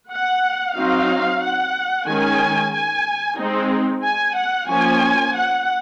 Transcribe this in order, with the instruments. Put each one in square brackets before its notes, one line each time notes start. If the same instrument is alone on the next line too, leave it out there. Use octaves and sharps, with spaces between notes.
[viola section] F#5
F#3 C4 D#4 F5
F#5
D#3 G#3 C#4 G#5
G#5
G#3 C4 D#4
G#5
F#5
F3 A#3 C#4 G#5
F#5